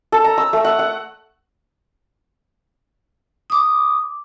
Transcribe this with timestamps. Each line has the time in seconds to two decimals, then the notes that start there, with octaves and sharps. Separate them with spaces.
0.12 A4
0.24 A#5
0.38 E6
0.53 A3
0.64 F#5
0.79 F#5
3.50 D6 D#6